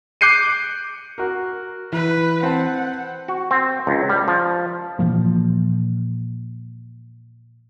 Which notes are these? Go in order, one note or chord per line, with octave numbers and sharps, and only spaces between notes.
D6 F#6 G6 C7 C#7 D#7
F#4 A#4
E3 B4
C4 F#5 A5
F#4
C4
C#2
G3
F3
A#2 E3 F3 A#3